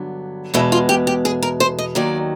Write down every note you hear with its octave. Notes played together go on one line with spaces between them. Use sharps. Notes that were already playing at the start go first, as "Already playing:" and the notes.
Already playing: G2 D3 F#3 B3
E2 B2 G#3 E4
F4
G4
G4
G#4
A#4
C5
D#5
D#2 D#3 F#3 D5